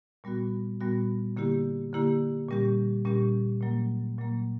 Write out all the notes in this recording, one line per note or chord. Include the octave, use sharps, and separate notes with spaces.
A#2 G3 B3 F#4
A#2 G3 B3 F#4
D3 A#3 E4 G4
D3 A#3 E4 G4
A#2 G3 C#4 G4
A#2 G3 C#4 G4
A#2 F#3 A#3
A#2 F#3 A#3